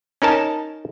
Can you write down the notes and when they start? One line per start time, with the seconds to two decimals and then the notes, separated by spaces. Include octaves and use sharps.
0.22 C#4 D#4 A#4 A5